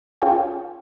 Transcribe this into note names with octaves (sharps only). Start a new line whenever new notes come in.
C#4 F4 G#4 C#5 G5 G#5